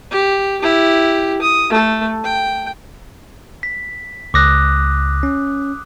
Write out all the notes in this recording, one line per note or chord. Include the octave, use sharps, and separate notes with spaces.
G4
E4 G4
D#6
A3 A4
G5
B6
C#2 D6 D#6 F#6 A#6
C#4